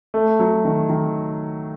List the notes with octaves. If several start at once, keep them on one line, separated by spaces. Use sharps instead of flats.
A3
F#3
D#3
D#3